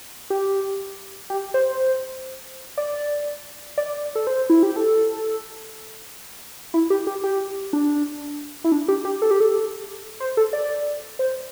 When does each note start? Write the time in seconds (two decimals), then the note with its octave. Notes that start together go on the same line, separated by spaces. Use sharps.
0.30 G4
1.30 G4
1.54 C5
2.78 D5
3.78 D5
4.15 A4
4.27 C5
4.50 E4
4.63 G4
4.76 A4
6.74 E4
6.90 G4
7.07 G4
7.24 G4
7.73 D4
8.64 E4
8.72 D4
8.88 G4
9.05 G4
9.22 A4
9.31 G4
9.40 A4
10.20 C5
10.37 A4
10.53 D5
11.19 C5